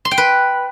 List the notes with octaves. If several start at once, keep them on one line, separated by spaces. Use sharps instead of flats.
C6
G5
B4